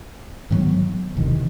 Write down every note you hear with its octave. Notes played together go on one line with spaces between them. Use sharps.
G#2 D#3 F#3 B3
E1 E2 C3 D#3